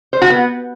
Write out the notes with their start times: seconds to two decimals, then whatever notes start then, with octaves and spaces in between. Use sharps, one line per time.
0.13 C5
0.22 F#4
0.30 B3